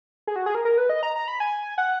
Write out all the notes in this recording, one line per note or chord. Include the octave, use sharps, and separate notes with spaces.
G#4
F#4
G#4
A#4
A#4
B4
D#5
A#5
A#5
B5
G#5
F#5